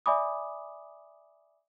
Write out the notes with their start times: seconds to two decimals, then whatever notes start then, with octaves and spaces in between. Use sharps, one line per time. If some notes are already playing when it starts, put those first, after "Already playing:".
0.06 D5 E5 G#5 B5 D6 D#6